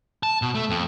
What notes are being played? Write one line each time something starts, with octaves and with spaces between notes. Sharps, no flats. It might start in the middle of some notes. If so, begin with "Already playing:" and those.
A5
B2
A3
F2